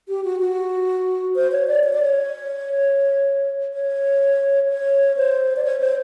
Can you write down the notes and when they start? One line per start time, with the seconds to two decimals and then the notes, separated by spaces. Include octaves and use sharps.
0.08 G4
0.24 F#4
0.40 F#4
1.36 C5
1.52 C#5
1.68 D5
1.83 C#5
1.93 D5
2.02 C#5
3.74 C#5
4.69 C#5
5.17 C5
5.57 D5
5.65 C#5
5.81 C5